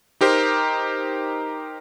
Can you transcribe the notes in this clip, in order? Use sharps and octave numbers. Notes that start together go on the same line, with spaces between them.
D#4 G4 A#4 C5